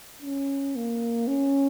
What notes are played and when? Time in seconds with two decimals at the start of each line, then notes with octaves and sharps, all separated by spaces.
0.22 C#4
0.76 A#3
1.27 C#4